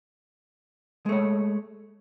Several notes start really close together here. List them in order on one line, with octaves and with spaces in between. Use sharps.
G#3 A3 C#5